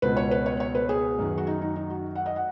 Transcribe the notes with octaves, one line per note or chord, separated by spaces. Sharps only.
C#2 B2 B4
C#5
B4
C#5
C#5
B4
G#4
F#2 D#3
F#4
D#4
D#4
D#4
F#4
F#5
D#5
F#5